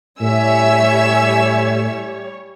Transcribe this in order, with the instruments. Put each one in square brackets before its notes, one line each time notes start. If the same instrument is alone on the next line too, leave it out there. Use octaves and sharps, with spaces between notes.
[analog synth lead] A2 [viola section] G3 C#5 [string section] E5 G#5 E6